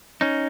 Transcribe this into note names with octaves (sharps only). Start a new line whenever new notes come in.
C#4 D#4